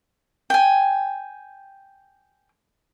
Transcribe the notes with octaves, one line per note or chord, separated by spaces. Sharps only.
G5 G#5